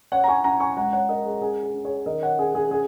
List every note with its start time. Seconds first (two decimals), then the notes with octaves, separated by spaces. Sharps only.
0.12 C#4 C#5 F#5
0.24 A#5
0.28 G#5 C#6
0.44 C#4 F#5 A#5
0.60 G#5 C#6
0.77 G#3 F#5 A#5
0.93 C#5 F#5
1.09 C#4 A#4 D#5
1.25 G#4
1.42 C#4 G#4
1.63 G#4
1.74 C#4
1.85 G#4 C#5
2.06 D#3 A#4 D#5
2.22 C#5 F#5
2.39 C#4 G#4
2.55 G#4
2.71 C#4 G#4